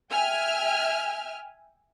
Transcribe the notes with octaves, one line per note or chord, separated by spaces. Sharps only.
E5 G5 G#5 F6